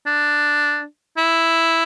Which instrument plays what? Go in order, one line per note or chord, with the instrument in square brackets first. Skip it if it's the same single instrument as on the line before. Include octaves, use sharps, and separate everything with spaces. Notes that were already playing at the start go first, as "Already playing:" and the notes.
[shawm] D4
E4